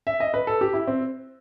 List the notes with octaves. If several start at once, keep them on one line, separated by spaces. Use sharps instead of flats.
E5
D#5
B4
A4
G4
E4
C4